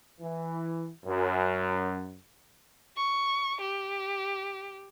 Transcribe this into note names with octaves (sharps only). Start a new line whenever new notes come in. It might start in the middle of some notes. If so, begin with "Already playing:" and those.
E3
F#2
C#6
G4